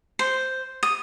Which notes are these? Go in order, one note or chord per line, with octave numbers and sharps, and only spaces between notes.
C5
D#6